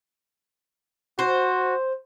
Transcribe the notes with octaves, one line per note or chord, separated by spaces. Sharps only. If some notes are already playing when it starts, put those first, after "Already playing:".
F#4 C5